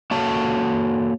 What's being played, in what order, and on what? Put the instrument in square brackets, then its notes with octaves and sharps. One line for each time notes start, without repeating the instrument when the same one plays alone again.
[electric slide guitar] A#3 F#4 A4 C#5 A5